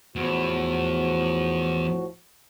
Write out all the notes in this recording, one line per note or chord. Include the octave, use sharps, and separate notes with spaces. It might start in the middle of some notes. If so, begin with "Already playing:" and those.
E2 A2 F3 F#4